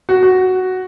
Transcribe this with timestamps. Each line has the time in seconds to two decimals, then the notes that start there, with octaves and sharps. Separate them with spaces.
0.09 F#4
0.23 F#4